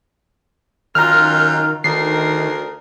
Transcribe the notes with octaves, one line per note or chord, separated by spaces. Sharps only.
F#2 D#3 F4 A#5 C6 F6
D2 D#3 A#4 C7